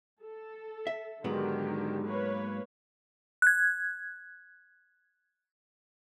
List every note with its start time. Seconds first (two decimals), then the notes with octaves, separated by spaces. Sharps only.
0.23 A4
0.87 E5
1.24 G#2 D3 D#3 F#3 B3 G4
2.06 A#3 B4 C#5
3.42 F#6 G#6